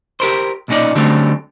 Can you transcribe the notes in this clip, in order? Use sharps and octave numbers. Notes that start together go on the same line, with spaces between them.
G4 A#4 C5
B1 A#2 G#3 C#4 D#4 D5
D3 F#3 G3 A3 C4 C#4